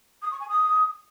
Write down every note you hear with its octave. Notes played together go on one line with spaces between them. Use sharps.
D#6
C#6
G#5
D#6